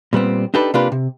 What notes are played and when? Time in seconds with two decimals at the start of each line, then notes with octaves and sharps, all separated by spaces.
0.13 A#2 G3 B3 C4
0.54 D4 D#4 G4 A4 B4
0.74 C3 A#3 D4 F4 G4 B4
0.92 C3